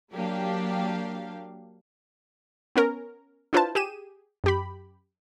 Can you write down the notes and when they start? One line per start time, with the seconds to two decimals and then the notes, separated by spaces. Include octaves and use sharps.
0.14 F#3 A#3 D4 G4 F5
2.76 B3 C#4 A#4
3.53 D4 E4 F4 B4 C5 A5
3.75 G4 G#4 D#7 E7
4.44 F#2 G4 B5